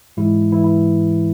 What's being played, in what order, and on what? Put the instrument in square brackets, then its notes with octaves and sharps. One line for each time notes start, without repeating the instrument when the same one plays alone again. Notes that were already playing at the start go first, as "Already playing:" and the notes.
[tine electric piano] G#2 E3 G#3 E4
E3 E4
E3 E4